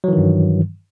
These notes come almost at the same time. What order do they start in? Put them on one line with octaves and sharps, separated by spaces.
F#3 E3 D#3 G2